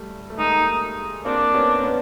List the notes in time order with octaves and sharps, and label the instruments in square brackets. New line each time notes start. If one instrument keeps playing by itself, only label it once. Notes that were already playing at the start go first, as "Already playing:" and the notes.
Already playing: [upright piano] G3 A3
A3
[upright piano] G#3 A#3 [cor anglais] D#4
[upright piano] A#3 C4 [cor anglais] D4
[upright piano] B3 C#4
B3 C#4